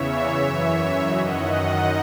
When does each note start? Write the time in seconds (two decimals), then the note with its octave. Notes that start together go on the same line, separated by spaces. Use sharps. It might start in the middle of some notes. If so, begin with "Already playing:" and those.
Already playing: E2 C#3 E3 C#5 E5
0.27 F#2 E3
1.02 F#2 D#3 D#5 F#5